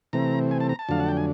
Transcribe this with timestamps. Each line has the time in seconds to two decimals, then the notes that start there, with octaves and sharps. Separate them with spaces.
0.13 C3 E3 A3 C4 A#5
0.51 G#5
0.60 A5
0.69 A#5
0.79 A5
0.89 F2 D3 F#3 A3 D4 F5
1.00 F#5
1.09 G5
1.17 G#5